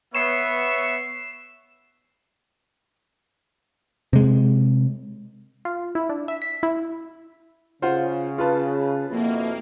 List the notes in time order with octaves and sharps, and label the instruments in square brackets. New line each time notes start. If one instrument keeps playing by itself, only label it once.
[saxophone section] B3 [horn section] C#5 E5 [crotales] C7 E7
[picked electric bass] C3 G#3
[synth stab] F4
E4
D4
E5
B6
E4
[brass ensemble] C#3 [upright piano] F4 C5 F#5
[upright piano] F4 B4 A5
[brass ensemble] F2 B2 E4 [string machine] A#3